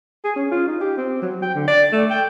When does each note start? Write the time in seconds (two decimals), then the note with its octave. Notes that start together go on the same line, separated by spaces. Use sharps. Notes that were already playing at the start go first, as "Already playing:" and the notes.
0.24 G#4
0.36 C#4
0.51 F4
0.67 D#4
0.80 G4
0.97 C4
1.22 F#3
1.42 G5
1.54 D3
1.67 D5
1.92 A3
2.10 G5